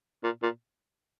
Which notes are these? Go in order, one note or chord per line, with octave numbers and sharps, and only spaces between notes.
A#2
A#2